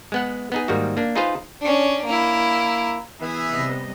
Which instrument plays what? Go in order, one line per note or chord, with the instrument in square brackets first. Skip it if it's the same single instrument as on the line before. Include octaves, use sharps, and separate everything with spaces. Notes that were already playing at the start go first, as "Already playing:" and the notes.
[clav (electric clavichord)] G#3 B3 F#5
B3 D#4 G#4
G#2 D#3 G3 A#3 F#4
A#3 D4
D#4 F4 G#4 B4 C5 F5
[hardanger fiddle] C#4 D4
A#3 E4
[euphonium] E3 [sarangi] B3 [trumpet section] G#4 E5
[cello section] C3 G3 D#5